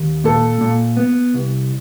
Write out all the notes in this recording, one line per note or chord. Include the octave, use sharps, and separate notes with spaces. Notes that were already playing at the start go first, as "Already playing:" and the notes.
Already playing: D#2
A#2 A4
A#2
B3
C2